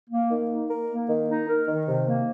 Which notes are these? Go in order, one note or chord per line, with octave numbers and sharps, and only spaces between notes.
A#3
D#3
D#4
A#4
A#3
D#3
D#4
A#4
D#3
C3
A#3